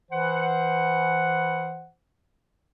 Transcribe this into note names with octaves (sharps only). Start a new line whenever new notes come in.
E3 C5 F#5